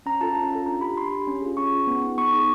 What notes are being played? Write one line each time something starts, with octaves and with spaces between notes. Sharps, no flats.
C#4 A#5
F4 A4 A5
C#4
F4 A4
D4 A#5
G4 B5
D4 C6
G4
C#4
F4 G#4
C#4 C#6
F4 G#4
B3
D#4 G#4
B3 C#6
D#4 G#4 D6